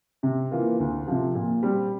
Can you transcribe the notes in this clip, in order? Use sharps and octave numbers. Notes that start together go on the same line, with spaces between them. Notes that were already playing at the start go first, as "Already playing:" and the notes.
C3
E3 A#3 F4
D2
C3 F3
A#2
G3 C4